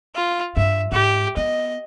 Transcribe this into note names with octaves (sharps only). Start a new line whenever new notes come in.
F4
G2 E5
G#2 G4
B3 D#5